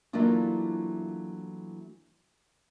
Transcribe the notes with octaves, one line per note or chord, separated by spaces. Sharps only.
E3 F#3 A3 A#3 D4 F4